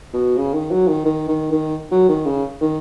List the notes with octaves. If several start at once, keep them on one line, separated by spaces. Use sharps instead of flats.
B2
C#3
D#3
F#3
D#3
D#3
D#3
D#3
F#3
D#3
C#3
D#3